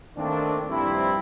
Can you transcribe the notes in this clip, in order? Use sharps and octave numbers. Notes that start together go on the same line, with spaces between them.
D#3 A3 A#3 C4 D4
G2 C3 F3 C4 E4